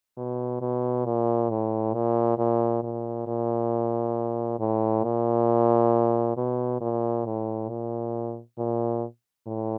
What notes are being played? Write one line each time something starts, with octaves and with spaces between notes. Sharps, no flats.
B2
B2
A#2
A2
A#2
A#2
A#2
A#2
A2
A#2
B2
A#2
A2
A#2
A#2
A2